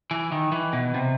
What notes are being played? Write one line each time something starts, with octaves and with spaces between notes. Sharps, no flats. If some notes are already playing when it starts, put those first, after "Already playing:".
E3
D#3
E3
B2
C3